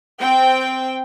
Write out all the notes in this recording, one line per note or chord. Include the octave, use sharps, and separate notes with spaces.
C4 G5